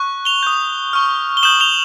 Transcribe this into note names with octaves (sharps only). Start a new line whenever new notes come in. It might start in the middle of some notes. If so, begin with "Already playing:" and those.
Already playing: C#6 F#6
F7 G7
D#6 G6
C#6 F6
G7
D#6 G6 E7 F#7
F7 G7